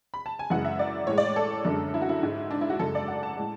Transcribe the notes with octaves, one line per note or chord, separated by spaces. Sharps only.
B5
A5
G#5
F#2 C#3 E3 G#3 F#5
E5
D5
A2 G#3 C#5
D5
A4
F#2 D3 G#3
E4
F#4
E4
G#2 G#3
D4
E4
F#4
F#2 C#3 G#3 A4
D5
F#5
A5
A2 G#3